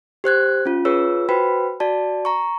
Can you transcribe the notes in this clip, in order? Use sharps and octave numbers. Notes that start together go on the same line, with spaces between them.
G4 C5 F#6 G#6
C#4 F4
F4 G#4 B4 C#5 E6
F#4 B4 C5 G5 B5
F#4 D5 A5
A#5 C#6